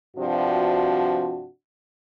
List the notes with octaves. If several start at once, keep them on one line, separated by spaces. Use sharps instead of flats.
G2 C3 F3 D4 F#4